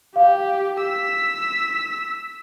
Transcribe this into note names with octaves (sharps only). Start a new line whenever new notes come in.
G4 F5
E6 B6